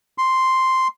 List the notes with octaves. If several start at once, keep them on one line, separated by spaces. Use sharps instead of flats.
C6